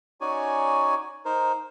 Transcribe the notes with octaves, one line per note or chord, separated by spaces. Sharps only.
C#4 D#4 F#4 C#5 D5 G#5
D#4 A#4 C5